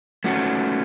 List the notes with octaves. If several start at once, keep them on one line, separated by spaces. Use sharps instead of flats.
A3 C#4 F#4